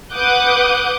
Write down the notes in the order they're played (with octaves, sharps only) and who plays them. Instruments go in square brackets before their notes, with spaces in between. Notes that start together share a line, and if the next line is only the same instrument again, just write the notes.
[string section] B4 F#5 D6 D#6 F#6 G6